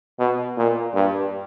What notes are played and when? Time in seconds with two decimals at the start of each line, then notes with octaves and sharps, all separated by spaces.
0.19 B2
0.57 A#2
0.94 G2